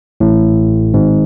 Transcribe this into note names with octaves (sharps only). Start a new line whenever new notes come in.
A1 A2
G#1 G#2